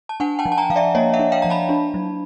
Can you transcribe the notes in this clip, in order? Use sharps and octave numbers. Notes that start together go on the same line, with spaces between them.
A5
D4 F#5 G#5
G5 A5
F3
A5
G#5 A#5
F3 F5
D5 E5
A#3 C#5 D#5
E5 F#5
D4
F5 G5
F3 A#5
A5 B5
D4
F#3